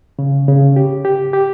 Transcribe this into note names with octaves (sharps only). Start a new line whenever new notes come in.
C#3
C#3
G4
G4
G4